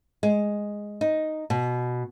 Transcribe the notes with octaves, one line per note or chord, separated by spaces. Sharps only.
G#3
D#4
B2